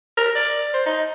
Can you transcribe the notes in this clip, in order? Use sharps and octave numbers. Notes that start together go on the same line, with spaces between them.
A#4
D5
C5
D#4